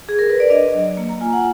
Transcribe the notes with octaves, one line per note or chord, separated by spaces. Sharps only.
G#4
A#4
B4
D5
D4 D#5
F#3
A#3
A#5
F4 G#5
F#5